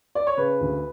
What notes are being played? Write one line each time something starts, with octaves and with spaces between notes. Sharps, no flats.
D5
C#5
C#3 B4
D2